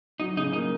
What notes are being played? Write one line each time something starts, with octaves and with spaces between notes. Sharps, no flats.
F#3 D#4
C#3 D#4
A#3 D#4